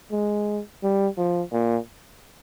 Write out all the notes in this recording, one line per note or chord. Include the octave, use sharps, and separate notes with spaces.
G#3
G3
F3
A#2